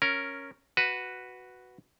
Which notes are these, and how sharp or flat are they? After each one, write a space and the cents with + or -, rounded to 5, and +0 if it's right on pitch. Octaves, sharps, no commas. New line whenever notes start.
C#4 +0 A#4 +0
F#4 +0 B4 +0